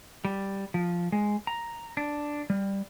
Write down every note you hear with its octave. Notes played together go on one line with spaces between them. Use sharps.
G3
F3
G#3
A#5
D4
G3